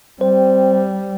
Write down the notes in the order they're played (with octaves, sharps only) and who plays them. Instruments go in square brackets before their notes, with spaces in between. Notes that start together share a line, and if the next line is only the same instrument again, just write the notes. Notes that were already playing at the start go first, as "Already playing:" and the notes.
[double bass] G3 [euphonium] C4 [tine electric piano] C5